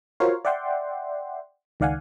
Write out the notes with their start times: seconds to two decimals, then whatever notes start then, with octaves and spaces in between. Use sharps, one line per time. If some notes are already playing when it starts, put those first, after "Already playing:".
0.20 F4 F#4 A#4 C5 C#5 F5
0.45 D5 E5 F#5 G5 C6
1.80 C#2 D#3 D5 F5 F#5 G#5